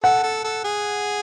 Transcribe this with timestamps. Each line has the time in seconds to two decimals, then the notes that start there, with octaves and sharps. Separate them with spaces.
0.04 A4 F#5
0.23 A4
0.44 A4
0.64 G#4